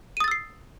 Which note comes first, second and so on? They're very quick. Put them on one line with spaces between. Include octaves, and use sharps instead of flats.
D#7 D#6 A6 E6 C7